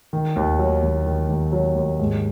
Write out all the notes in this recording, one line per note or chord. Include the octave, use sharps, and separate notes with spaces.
D#3
D#2
F#3
D#2
D#3
D#2
F#3
D#2
G#2